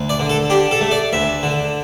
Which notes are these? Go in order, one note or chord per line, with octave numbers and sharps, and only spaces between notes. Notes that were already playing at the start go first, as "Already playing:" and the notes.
Already playing: D2
D5
D3
A4
D4 G4
A4
A3
D5
D2 E5
D3